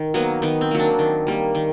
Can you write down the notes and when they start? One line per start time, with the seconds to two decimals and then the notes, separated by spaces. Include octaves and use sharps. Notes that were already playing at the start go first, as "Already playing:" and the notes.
Already playing: D#3
0.14 F#3 A#3 B3
0.42 D#3 B3
0.61 C4
0.71 F#3 A#3
0.80 D4
0.99 D#3
1.27 G3 A#3
1.55 D#3